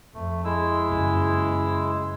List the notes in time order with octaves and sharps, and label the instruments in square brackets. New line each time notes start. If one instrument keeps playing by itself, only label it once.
[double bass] F2 [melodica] A3
[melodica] G#3 E4 E6
[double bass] F#1